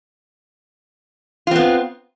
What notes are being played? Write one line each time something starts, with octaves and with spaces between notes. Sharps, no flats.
B3 C4 F4